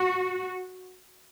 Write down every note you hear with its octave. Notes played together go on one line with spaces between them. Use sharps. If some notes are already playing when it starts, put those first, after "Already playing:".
Already playing: F#4